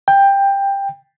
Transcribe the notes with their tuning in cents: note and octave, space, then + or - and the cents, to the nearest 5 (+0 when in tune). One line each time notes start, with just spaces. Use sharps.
G5 +15